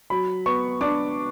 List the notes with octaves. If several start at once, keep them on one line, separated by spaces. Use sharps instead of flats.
F#3 B5
B3 C#6
D4 D6